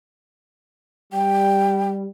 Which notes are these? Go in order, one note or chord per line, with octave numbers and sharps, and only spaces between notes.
G3 G5